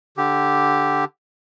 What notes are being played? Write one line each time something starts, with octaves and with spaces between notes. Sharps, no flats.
D3 G4